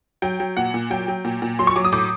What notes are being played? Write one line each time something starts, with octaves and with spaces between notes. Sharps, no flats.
F#3 G5
F#3
A#2 F#5
A#2
F#3 G5
F#3
A#2
A#2
F#3 C6
C#6
F#3 D6
D#6
A2 D6